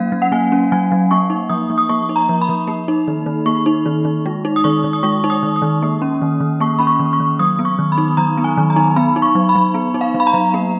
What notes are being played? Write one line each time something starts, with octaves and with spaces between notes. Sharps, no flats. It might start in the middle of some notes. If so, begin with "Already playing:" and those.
Already playing: F#3 A#3 C#4 F5
F#3
F#5
A#3 G#5
C#4
F#3 G#5
F#3
A#3 C#6
D#4
F3 D#6
F3
D#6
A#3 C#6
D#4
A#5
F3
B5
F3
A#3
D#4
D#3
D#3
A#3 C#6
D#4
D#3
D#3
G#3
D#4
D#6
D#3 C#6
D#3
D#6
G#3 C#6
D#4
D#6
D#3
D#6
D#3
A#3
C#4
D#3
D#3
A#3 C#6
C#4 B5
C#6
D#3
C#6
D#3
F#3 D#6
B3
C#6
D#3
B5
D#4
F#3 A#5
B3
G#5
D#3
A#5
D#4
B3 B5
D#4
C#6
F#3
B5
F#3
B3
D#4
F5
F#3
B5
A#5
F#3
A#3